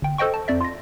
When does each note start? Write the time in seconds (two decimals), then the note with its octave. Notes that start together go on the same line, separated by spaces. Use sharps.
0.02 G1 G5
0.18 A4 C5 D#5 G5 C#6
0.34 A5
0.48 F2 D5 E5
0.61 F4 A#6